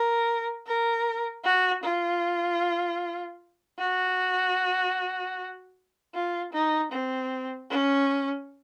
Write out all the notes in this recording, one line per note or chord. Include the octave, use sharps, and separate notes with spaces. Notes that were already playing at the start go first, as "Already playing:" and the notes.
Already playing: A#4
A#4
F#4
F4
F#4
F4
D#4
C4
C#4